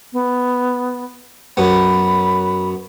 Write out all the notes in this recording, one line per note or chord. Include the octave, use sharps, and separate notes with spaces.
B3
F#2 B3 B5